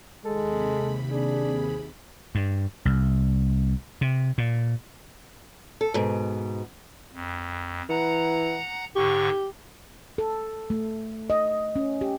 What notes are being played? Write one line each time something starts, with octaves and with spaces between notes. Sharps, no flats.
D#2 C3 G#3 A4 B5
D4 G#4
G2
C2
C3
A#2
A4
G#2 B2
F2
E3 F#5 A#5
G#2 D3 G4 C#6
A4
A3
D#5
C#4
G4